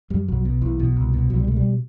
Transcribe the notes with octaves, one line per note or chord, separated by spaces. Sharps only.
F#2 G3
B1 F#3
B2
B1 E3
B2
C2
B2
C2 F#3
G3
B2 A3
G3